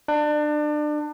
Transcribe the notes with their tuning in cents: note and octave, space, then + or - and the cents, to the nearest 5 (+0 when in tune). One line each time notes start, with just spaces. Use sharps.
D4 +30